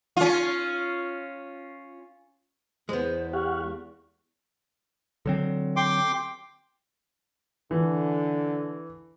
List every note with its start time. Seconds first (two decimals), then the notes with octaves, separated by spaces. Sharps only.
0.17 C#4 F4
2.89 E2 G#3 B3 C5
3.33 G4 F5 F#5 C#6
5.26 D3 F#3 C4
5.76 G5 C6 D6
7.71 D3 E3